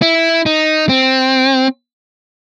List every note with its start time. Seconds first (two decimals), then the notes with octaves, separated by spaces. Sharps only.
0.02 E4
0.46 D#4
0.89 C4